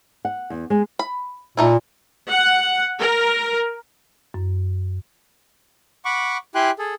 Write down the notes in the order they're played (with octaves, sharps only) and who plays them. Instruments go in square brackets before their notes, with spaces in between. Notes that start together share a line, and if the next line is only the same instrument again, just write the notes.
[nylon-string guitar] F#5
E2
G#3
[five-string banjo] B5
[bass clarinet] A#2 [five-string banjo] A3 D#4 E4
[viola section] F#5
A#4
[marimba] F#2
[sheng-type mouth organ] F#5 B5 C#6 D6
E4 G4 G5 G#5 C6 F#6
G#4 A4